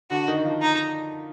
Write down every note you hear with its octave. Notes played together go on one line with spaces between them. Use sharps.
D3 D4 F#4
D#3 D#4
F3 F4
D#4